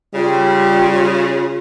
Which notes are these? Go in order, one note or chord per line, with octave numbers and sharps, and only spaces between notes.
C#3 G3 F4